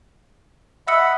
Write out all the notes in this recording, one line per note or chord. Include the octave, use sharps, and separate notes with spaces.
D#5 E5 F#5 B5 E6 C#7